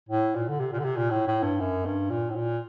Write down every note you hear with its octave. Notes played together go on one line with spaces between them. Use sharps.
A2
A#2
D3
C3
A#2
D3
C3
A#2
A2
A2
G2
F#2
G2
A#2
A2
A#2